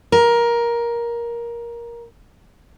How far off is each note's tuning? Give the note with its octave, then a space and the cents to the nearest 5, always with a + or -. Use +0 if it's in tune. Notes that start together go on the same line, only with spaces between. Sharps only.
A#4 +15